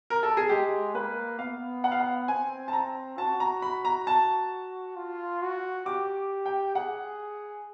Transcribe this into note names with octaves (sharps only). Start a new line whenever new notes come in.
A#4
A4
G#4
G#3 G4
A#3 B4
B3 F5
F#5
F5
F#5
C4 G#5
A5
A#5
F#4 A5
A#5
B5
A#5
A5
F4
F#4
G4 D6
G5
G#4 F#5